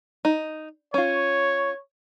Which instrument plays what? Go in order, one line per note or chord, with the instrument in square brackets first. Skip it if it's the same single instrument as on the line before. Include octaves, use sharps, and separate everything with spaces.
[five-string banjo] D#4
[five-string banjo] C#4 F4 [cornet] C#5